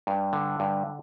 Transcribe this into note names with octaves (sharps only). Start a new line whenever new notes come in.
G2
D3
G2